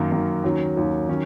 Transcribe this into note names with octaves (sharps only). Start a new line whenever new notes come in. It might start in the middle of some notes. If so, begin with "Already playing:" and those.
Already playing: F#2 D#3 A#3
F#2 D#3 A#3
D#2 D#3 F#3 C#4
D#2 D#3 F#3 C#4
D#3 F#3 C#4